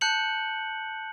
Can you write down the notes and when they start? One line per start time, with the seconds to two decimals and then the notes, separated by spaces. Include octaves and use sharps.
0.01 A5 F#6 G6 C#7 F#7